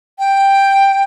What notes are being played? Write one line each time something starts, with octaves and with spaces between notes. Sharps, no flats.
G5